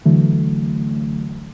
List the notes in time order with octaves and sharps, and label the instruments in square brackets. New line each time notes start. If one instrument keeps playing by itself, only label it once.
[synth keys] D3 E3 F#3 A3